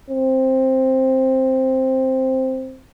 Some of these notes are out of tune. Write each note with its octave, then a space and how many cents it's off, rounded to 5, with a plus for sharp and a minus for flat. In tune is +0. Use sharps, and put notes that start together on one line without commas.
C4 +5